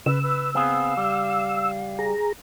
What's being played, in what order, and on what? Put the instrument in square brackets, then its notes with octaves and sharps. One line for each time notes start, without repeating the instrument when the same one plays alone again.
[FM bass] C#3 [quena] B4 [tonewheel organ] E6
[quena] B4
[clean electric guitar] B3 C4 G#4 [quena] F5
[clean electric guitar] G3
[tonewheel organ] G#4 A#5